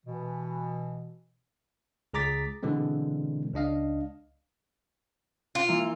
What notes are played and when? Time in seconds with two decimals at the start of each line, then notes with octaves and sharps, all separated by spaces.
0.06 B2 E3
2.14 C#2 G#4 A#5 D6 A6 B6
2.63 B2 D3 E3 G#3 C4
3.54 C#2 D4 D#5 F5
5.55 F4
5.68 E3 A#3